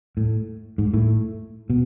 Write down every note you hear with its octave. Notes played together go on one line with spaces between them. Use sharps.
A2
G#2
A2
B2